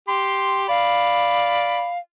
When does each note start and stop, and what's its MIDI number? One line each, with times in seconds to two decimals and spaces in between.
0.08 0.64 67
0.08 0.64 84
0.69 1.89 74
0.69 1.98 77
0.69 1.89 83